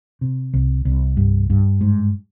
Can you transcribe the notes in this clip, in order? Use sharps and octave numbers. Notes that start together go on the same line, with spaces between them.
C3
C2
C2
G2
G2
G#2